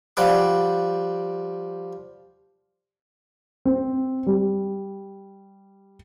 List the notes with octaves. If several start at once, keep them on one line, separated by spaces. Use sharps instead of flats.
F3 G3 F#5 D6
C4
G3